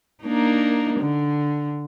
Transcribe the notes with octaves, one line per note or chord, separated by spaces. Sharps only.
A#3 D4 D#4
D3